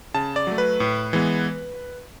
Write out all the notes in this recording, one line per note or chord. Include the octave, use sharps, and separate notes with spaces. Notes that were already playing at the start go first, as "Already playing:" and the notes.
C#3 A5
D5
F#3 A3
B4
A2
E3 G#3 B3